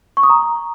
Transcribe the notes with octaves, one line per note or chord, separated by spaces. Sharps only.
C#6
D#6
A#5